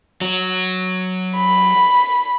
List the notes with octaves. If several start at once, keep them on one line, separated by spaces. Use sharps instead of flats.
F#3
B5